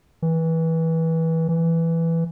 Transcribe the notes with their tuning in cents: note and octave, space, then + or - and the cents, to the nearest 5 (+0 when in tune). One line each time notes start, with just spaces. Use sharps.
E3 -20
E3 +5